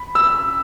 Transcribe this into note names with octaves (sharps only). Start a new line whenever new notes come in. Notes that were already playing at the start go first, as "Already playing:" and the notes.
Already playing: B5
E6